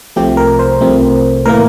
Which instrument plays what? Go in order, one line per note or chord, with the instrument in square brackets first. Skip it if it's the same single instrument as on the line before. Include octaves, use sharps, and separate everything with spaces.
[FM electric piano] C2 C3 F3 A3 C4 G4
A#4
C5
C2 C3 F3 A3 C4
A2 E3 A#3 A#4